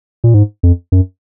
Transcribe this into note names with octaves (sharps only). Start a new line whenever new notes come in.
A#2
G#2
F2
F#2